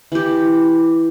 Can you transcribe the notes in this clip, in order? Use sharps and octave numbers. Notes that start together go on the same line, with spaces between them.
E3 G4